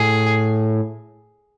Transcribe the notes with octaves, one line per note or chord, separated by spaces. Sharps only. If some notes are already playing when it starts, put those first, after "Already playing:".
Already playing: A2 G#4